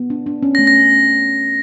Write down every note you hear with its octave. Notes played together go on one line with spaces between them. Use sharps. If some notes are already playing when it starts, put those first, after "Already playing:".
Already playing: B3
D4
D4
C#4
A#6
A3
A#6